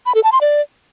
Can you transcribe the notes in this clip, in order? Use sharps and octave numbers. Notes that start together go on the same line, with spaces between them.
B5
A4
A5
C6
D5